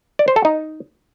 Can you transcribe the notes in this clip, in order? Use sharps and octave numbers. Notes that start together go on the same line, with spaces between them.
D5
C5
A4
D#4